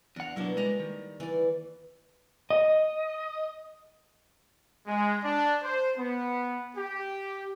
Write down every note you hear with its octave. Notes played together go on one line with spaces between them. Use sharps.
E2 D4 F5 F#5
B2 F#3 A#3 D4 E4
G3 G#3 D#5 A#5
D#3
E3 D5
D#5
G#3
D4
C5
B3
G4